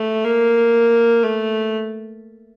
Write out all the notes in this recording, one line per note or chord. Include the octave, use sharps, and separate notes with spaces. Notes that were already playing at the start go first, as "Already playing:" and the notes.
Already playing: A3
A#3
A3